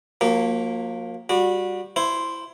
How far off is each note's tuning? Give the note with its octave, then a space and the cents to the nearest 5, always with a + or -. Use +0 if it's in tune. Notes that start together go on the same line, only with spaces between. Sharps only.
F3 +40 A#3 +0 F#4 +45
G3 +0 F#4 -25
E4 +15 C5 +0